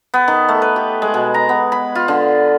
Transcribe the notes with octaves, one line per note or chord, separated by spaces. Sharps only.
B3
D#3
A3
B4
G4
G#3
B2
A#5
B3
B5
F4
D3